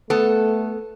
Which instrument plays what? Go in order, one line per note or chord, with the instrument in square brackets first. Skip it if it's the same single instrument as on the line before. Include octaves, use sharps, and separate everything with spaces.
[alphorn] A3 [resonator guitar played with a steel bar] B3 A4